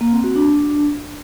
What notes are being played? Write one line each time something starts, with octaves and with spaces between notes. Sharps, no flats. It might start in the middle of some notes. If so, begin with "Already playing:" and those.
A#3
C4
F#4
D4